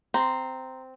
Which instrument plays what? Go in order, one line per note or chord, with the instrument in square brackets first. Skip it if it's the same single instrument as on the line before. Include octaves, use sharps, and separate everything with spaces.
[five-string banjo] C4 [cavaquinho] A#5 C6